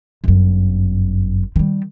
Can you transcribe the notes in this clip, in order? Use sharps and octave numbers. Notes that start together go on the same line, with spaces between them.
G1 F#2
D#3 G3